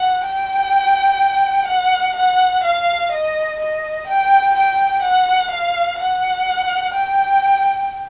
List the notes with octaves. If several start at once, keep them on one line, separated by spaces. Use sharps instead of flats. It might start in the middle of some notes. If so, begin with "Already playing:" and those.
Already playing: F#5
G5
F#5
F#5
F5
D#5
D#5
G5
G5
F#5
F5
F#5
G5